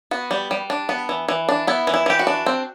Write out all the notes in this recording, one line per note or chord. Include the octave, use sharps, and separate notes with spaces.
B3 F#4
G3
G3
D4
B3
E3
E3
D4
B3 E4
E3
E4
E3 G4
F#4
D4
C4